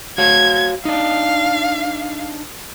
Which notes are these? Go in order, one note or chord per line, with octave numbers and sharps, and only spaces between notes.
F#4 C#5 F5 G#6
D4 D#4 F5